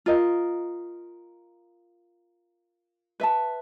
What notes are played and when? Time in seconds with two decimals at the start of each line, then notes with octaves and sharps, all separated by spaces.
0.06 F4 A#4 D#5
3.20 B4 E5 A5